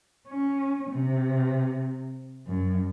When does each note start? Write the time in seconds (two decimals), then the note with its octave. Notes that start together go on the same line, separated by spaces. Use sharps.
0.28 C#4
0.90 C3
2.47 F#2